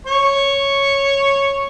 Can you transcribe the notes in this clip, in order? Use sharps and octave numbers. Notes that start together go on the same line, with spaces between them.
C#5 C#6